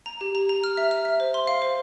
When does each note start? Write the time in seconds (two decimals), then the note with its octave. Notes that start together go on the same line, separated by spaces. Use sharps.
0.06 A#5
0.21 G4
0.35 A#5
0.49 A#5
0.64 F6
0.77 E5
0.91 F6
1.05 E5
1.20 C5
1.34 C6
1.47 F5
1.62 C5